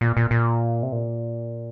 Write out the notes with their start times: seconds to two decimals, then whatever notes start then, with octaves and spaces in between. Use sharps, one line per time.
0.01 A#2
0.17 A#2
0.31 A#2
0.83 C3
0.92 A#2